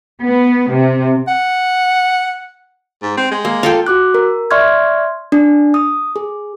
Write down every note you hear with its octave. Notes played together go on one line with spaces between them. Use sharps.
B3
C3
F#5
G#2
C4
G#3
A#3
F4 A4 G5
F#4 D6 F#6
A#4
D5 E5 C6 C#6 F6 G#6
D4
D#6
G#4